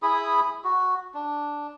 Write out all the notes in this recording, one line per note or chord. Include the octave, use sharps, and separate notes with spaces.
E4 G#4 B5 D#6
F#4
D4